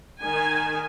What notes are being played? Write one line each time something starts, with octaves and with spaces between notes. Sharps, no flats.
D#3 G#5